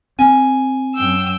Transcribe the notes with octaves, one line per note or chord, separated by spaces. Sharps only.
C4 G#5
F#2 G5 E6